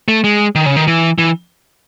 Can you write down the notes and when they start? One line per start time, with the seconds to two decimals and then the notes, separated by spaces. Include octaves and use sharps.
0.08 A3
0.24 G#3
0.55 D#3
0.66 C#3
0.76 D#3
0.87 E3
1.18 E3